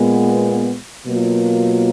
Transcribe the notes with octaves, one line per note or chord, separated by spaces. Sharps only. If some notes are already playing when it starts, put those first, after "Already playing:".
Already playing: A#2 G#3 B3
B2 F#3 A#3 F4